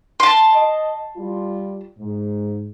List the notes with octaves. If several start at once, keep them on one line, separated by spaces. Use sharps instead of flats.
A5 C6
D#5
G3 F4
G#2